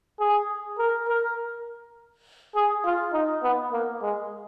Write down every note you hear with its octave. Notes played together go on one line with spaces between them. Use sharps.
G#4
A#4
A#4
G#4
F4
D#4
B3
A#3
G#3